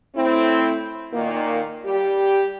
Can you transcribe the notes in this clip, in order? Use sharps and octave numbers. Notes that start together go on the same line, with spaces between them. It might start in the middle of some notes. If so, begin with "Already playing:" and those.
A2 C4 E4
A#2 D#3 A#3
G3 G4